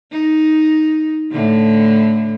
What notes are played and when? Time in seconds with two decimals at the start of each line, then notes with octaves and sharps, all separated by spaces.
0.12 D#4
1.31 A2 D3